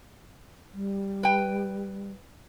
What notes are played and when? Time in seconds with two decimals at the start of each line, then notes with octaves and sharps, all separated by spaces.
0.74 G3
1.23 B4 G5